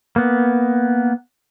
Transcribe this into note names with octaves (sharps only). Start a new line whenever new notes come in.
A#3 B3